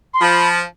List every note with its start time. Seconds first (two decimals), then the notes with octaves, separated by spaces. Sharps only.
0.14 C6
0.21 F3 B5